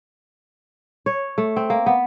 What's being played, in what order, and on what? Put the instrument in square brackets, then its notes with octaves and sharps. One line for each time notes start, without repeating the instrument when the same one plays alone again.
[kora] C#5
A3
C4
A#3
B3